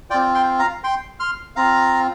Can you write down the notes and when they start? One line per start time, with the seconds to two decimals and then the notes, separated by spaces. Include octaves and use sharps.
0.10 F4 D5 G5
0.14 C4
0.35 G5 C6
0.59 F5 A#5
0.84 G5 C6
1.20 C6 F6
1.56 C4 F4 F5 A#5